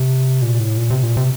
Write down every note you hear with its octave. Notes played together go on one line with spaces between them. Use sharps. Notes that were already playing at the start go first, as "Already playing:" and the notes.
Already playing: C3
A#2
A2
A#2
C3
A#2
C3